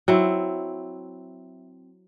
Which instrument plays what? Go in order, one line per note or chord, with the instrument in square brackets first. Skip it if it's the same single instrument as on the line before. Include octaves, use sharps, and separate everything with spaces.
[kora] F#3 C4 E4